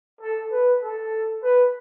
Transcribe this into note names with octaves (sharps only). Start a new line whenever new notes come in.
A4
B4
A4
B4